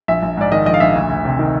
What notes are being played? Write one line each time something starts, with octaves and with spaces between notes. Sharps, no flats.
A#1 E5
A#1
G#2 D5
D#3 D#5
A#1 D#5
F5
A#1 E5
D2
D2
C3
D#3